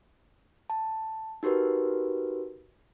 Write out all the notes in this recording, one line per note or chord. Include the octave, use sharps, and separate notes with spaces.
A5
D#4 F#4 G4 A#4 B4